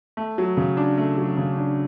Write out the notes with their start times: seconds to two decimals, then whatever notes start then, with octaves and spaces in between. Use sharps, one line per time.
0.17 A3
0.38 F#3
0.57 C#3
0.77 D4
0.98 A3
1.17 F#3
1.37 C#3
1.58 D4